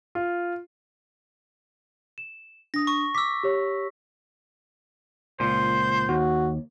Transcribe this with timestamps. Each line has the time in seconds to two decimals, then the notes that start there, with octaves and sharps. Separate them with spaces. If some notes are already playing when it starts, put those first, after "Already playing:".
0.15 F4
2.18 E7
2.74 D4 D#6 A#6
2.87 C#6
3.15 D6 E6 B6
3.43 G4 C#5
5.40 C#2 A#2 C5
6.09 D#2 F#4